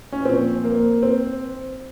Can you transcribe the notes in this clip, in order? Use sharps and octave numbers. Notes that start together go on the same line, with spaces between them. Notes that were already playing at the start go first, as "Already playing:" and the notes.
C#4
A#2 F3 C4
A#3
C4